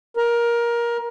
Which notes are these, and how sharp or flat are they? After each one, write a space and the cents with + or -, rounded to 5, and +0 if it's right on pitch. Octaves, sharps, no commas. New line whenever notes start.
A#4 +20